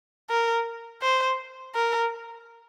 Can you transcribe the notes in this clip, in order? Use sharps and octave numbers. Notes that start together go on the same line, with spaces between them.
A#4
C5
A#4